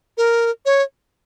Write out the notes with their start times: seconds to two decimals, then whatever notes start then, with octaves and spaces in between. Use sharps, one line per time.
0.17 A#4
0.66 C#5